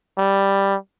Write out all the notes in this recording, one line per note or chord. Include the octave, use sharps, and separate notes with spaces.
G3